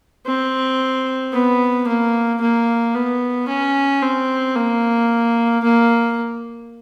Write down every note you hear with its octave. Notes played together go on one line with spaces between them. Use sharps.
C4
B3
A#3
A#3
B3
C#4
C4
A#3
A#3